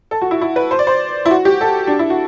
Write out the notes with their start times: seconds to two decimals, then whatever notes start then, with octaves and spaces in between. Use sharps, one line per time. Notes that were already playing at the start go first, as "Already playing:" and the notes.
0.11 A4
0.22 F#4
0.31 E4
0.41 E4
0.56 B4
0.71 C5
0.79 D5
0.87 C5
1.26 E4
1.31 F#4
1.45 G4
1.61 A4
1.87 D4
1.99 E4
2.10 F#4